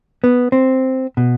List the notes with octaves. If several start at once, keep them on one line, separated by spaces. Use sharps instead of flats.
B3
C4
B2